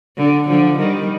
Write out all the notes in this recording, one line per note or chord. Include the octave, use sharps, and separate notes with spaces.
D3
D3 F3
D#3 G3